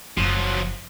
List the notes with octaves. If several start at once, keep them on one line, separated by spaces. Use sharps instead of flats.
F#1 F3 F#3